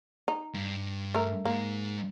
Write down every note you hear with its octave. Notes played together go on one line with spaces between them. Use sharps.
D#4
G2
A3 A#4
G#2 G#3 A#3